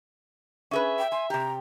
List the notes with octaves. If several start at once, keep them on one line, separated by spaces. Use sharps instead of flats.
C#4 G#4 B4 E5
G5
G#5 C6
C3 G4 A#5